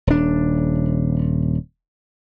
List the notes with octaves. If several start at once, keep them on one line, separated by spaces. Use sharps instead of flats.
D#1 D4